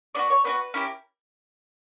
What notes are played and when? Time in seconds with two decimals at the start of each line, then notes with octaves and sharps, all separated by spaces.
0.15 B3 D4 F#4 D5
0.30 C#5
0.44 B3 D4 F#4 B4
0.74 C#4 E4 G4 A#4